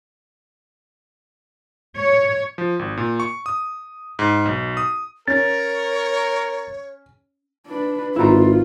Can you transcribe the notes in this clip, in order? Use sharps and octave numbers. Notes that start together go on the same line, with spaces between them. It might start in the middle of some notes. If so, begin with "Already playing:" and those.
C#5
F3
G#1
A#2
C#6
D#6
G#2
B1
D#6
C#4 A#4 C#5 A6
D4 B4
G#1 E4 F4 B4 A#5